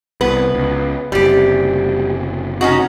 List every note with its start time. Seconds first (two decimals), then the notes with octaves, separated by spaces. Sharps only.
0.21 C2 B3 B4
0.55 C#2
1.12 F#1 C3 G3 G4
2.61 C#4 D#4 F#4